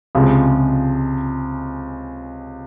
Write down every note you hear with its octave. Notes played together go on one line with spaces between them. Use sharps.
C#2 C3 F3 G#3